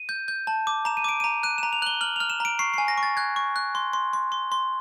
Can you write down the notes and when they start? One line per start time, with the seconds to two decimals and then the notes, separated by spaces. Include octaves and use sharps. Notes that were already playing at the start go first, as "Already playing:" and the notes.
Already playing: D#7
0.09 G6
0.28 G6
0.47 A5
0.67 D6
0.85 A#5 E7
0.97 D#7
1.04 D6 D7
1.20 A#5 D#7
1.43 F#6 D#7
1.58 A#5 E7
1.73 F7
1.82 F#6 F#7
1.87 G7
2.01 F6 F#7
2.16 F6 F7
2.30 E7
2.40 A#5 D7
2.59 C#6 C7
2.74 G#5 C7
2.88 A#6
2.98 C#6
3.03 A6
3.17 F#6 G#6
3.36 C#6
3.56 F#6
3.75 C6
3.93 C6
4.13 C6
4.32 C6
4.52 C6